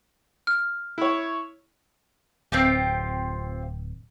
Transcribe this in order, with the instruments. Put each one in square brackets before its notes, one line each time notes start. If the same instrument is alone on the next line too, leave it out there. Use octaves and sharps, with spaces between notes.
[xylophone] F6
[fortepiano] E4 C#5
[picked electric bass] D1 [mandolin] C4 F4 G4